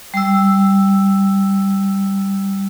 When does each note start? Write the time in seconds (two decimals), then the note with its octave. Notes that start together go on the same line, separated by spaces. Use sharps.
0.14 G3 E6